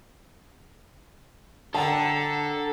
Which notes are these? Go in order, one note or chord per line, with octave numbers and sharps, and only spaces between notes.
D3 A4 F#5 G5 A5 A#5